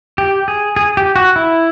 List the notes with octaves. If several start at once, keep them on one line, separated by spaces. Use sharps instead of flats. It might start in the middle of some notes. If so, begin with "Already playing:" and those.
G4
G#4
G#4
G4
F#4
E4